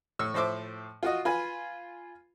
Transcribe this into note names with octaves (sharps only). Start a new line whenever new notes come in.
A2 C#6 E6
A2 F3 C5 E5 D6
F4 F#4 D#5
F4 B4 G#5